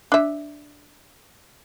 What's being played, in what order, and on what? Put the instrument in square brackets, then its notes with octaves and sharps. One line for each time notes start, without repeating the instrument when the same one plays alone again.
[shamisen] D4 E5